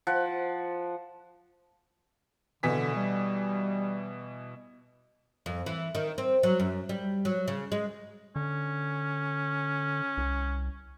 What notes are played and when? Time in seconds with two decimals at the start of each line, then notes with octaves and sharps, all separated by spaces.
0.07 F3 F#5
2.63 B2 D3 E3 B6
2.95 G3
5.46 F2
5.66 E3
5.95 D#3
6.18 C4
6.43 F#3
6.60 F#2
6.89 G3
7.25 F#3
7.48 C#3
7.72 G#3
8.36 D3 C#4
10.17 C2